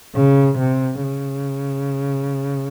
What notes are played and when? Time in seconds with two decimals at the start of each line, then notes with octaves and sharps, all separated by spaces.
0.16 C#3
0.59 C3
1.03 C#3